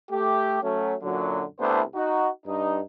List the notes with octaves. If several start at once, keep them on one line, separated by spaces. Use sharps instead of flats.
A3 G4
F#3 A3 C#4
F#2 A#2 D3 F#3
C2 A3 B3 D4 E4 C5
D#4 F#4
G2 D#4